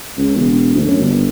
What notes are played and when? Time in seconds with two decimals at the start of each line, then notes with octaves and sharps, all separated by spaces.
0.17 C#2
0.35 E1
0.75 D2
0.87 F#2
1.00 G1